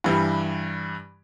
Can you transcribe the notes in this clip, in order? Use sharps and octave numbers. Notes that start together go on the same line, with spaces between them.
G2 E3 G3